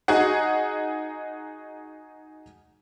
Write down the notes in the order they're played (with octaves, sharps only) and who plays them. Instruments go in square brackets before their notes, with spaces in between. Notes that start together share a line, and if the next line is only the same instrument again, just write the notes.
[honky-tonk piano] D#4 F#4 G#4 F#5